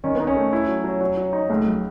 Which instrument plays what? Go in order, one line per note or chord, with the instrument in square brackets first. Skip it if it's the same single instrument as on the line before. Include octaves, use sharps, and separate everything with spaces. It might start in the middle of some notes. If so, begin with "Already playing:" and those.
[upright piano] D#3 [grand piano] C#4
[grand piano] B3
[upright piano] D#4
[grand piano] C#4
[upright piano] A3
E4
F#3
F#3
F#3
F#3
D#4
[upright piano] C#2 [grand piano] A3
[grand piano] F#3